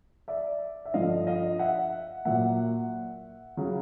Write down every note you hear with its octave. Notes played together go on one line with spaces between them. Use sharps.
D5 E5
E5
G2 D3 F3 D#5 F5
D#5 F5
E5 F#5
A#2 F#3 E5 F#5
C#3 F#3